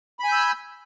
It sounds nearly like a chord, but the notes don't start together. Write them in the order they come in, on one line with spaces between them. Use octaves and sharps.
B5 G#5 G6 E6